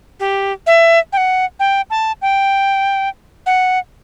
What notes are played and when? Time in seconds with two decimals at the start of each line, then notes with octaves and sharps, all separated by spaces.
0.20 G4
0.67 E5
1.13 G5
1.17 F#5
1.60 G5
1.90 A5
2.22 G5
3.46 F#5